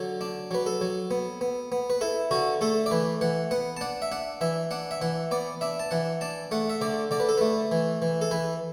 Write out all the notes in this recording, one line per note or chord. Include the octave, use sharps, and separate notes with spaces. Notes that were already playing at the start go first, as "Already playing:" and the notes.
Already playing: D3 F#3
D4
F#3 B4
A4
F#3
B3
B3
B3
B4
E4 A4
D3 F#4
A3 A4
D5
E3 B4
E3 F#5
B3 F#5
A5
D4 F#5
E5
D4 F#5
E3 E5
D4 F#5
E5
E3 F#5
B3 D5
D4 E5
A5
E3 F#5
D4 A5
A3 F#5
E5
D3 D5
D3 D5
B4
A4
A3 B4
E3
E3
A4
E3 B4